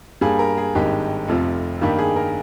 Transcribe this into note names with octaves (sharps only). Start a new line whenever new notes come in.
G2 G3 A#3 G#4
A#4
G#4
G#1 G2 D#3 G#3 G4
F1 F2 C3 F3
G2 D#3 G3 A#3 G4
G#4
A#4